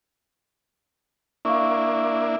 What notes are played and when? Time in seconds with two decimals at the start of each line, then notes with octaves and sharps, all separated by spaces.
1.45 A#3 D4 E4 F5 C#6